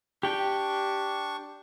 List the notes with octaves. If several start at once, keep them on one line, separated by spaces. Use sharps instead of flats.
D4 G4 G5 C#6